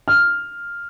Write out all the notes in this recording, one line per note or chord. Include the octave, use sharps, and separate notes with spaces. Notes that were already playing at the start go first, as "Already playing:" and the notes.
F6